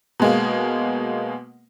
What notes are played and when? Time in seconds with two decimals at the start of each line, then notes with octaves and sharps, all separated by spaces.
0.20 B2 G#3 A#3